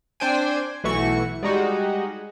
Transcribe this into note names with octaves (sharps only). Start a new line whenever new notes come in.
C4 D4 C5 G5 G#5
B1 E3 A3 F#4 C#6
G3 G#3 D#4 F#4